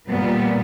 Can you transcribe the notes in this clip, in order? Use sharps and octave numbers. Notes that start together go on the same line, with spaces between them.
A#2 G3 B3